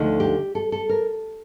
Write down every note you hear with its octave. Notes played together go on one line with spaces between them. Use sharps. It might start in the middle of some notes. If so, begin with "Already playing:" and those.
Already playing: D2 D3 F3 A3 D#4
G4
A4
A4
A#4